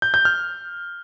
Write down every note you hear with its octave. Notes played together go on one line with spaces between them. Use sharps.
G6
G6
F6